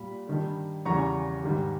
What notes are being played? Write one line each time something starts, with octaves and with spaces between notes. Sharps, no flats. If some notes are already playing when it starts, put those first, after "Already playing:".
Already playing: A#2 G3 B5
G2 D#3 G3
E2 C#3 E3 G3 A#5 C#6
G#2 D#3 G3